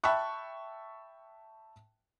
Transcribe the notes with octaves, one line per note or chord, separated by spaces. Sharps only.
E5 G5 A5 B5 C#6 F#6